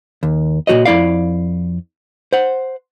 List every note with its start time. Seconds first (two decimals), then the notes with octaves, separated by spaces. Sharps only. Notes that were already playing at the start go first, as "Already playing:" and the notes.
0.23 D#2
0.67 A#2 E3 F#4 C#5 D#5
0.85 F2 E4 D5 F5
2.33 C5 F#5